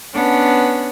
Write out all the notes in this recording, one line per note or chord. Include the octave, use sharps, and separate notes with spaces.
B3 C#4 D4